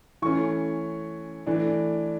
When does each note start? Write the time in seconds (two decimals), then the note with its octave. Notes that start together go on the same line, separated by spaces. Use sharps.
0.22 E3 A3 C#4 C#6
1.47 E3 A3 D4